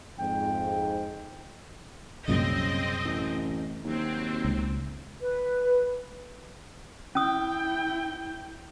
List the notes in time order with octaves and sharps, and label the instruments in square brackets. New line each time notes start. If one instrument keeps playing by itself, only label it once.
[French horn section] F2 G#2 [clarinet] G5
[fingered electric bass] C2 F#2 A#2 [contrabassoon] C#3 [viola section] C4 D#5
[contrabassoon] A1
[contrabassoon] D#2 [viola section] F#3 C4
[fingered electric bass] C#2
[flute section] B4
[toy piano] C#4 D#6 [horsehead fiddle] E4 G5